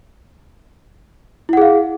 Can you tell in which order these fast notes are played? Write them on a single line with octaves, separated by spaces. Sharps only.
E4 F#5 G#4 F5